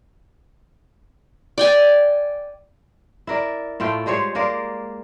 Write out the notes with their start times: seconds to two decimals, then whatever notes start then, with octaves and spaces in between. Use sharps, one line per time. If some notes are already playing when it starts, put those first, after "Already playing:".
1.58 D5 G5 G#5
3.27 E4 A#4 D5
3.80 A2 A3 F4 G5
4.06 G3 G#3 C5 C#5
4.35 G#3 A#3 A#4 D5